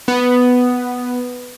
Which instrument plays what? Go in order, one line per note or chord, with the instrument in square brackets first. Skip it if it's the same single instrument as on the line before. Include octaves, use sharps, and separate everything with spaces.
[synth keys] B3